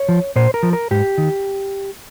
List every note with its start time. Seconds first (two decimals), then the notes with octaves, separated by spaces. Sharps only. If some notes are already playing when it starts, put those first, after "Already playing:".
Already playing: C#5
0.09 F3
0.36 A#2 C5
0.54 A#4
0.63 F3
0.73 A#4
0.91 G#2 G4
1.18 D#3